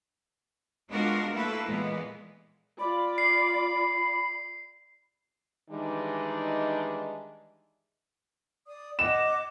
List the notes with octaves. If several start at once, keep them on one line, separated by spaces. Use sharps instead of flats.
G#3 B3 D4 F4 F#4 A#4
A3 A#3 E4 A4 B4
A#2 E3 G#3 B3
F4 D5 B5
C7
D#3 E3 G3 G#3 D4 D#4
D5 D#6
D#5 F#5 D6 E7